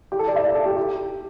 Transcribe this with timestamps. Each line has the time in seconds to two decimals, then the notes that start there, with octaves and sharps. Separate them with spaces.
0.12 G4
0.19 A4
0.28 D5
0.36 E5
0.44 D5
0.55 A4
0.66 G4
0.77 G4